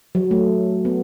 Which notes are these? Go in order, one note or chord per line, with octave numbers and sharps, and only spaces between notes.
F#3
A3
B3